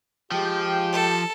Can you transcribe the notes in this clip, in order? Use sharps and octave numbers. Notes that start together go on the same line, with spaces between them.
F3 G#3 G4 G5
A4